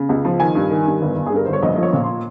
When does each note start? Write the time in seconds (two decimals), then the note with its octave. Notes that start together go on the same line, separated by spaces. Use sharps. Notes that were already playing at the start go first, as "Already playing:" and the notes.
Already playing: C#3
0.09 C#2
0.25 F3
0.40 D#3 G#5
0.55 G2
0.70 D#3
0.86 G2
1.02 G1
1.16 G1
1.26 G#4
1.32 G2 A#4
1.45 G1 C5
1.53 C#5
1.62 A#1 D#5
1.76 F3 D#5
1.83 C#5
1.93 A#2
2.04 C6